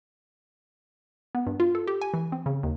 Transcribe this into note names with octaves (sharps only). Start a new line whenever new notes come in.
B3
G2
F4
A4
G4
G#5
E3
C4
C#3
D#2